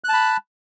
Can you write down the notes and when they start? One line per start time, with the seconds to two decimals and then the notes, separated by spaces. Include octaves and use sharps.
0.04 F#6
0.09 A5
0.14 B5